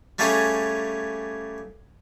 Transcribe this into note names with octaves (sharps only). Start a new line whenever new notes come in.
G3 A3 A#3 C#4 G#4